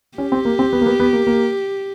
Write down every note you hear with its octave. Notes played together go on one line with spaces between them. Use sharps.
C#4 G4
C4
A#3
C4
B3
A#3
B3
B3
A#3
A#3